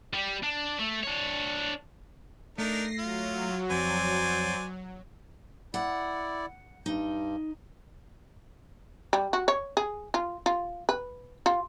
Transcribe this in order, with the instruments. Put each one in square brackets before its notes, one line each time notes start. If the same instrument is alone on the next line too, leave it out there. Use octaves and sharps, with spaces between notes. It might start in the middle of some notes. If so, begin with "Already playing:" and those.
[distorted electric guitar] G3 G4
D4
A3
D4 C#5
[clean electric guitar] A3 [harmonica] D4 D#4 A#4 [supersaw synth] A#6 C7
[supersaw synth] F#3 [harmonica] F4
[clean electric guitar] F2 [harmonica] C5 D5 G#5
[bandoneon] E4 D5 [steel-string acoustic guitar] F#5
[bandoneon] G2 [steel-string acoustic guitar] D#4
[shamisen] G3
F#4
C#5
G#4
F4
F4
B4
F4